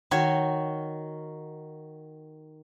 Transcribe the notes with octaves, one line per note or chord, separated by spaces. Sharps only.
D#3 F#4 C#5